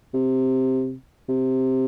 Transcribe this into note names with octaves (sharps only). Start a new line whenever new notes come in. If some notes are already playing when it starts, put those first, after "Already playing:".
C3
C3